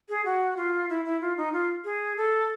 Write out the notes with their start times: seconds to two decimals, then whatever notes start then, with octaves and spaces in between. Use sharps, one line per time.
0.09 G#4
0.25 F#4
0.57 F4
0.90 E4
1.05 E4
1.21 F4
1.37 D#4
1.53 F4
1.85 G#4
2.17 A4